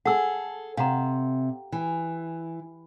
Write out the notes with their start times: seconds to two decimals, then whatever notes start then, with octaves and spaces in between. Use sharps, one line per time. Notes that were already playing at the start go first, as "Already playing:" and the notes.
0.05 G#4 A4 F#5 E6
0.77 C3 F5 F#5 A#5
1.72 E3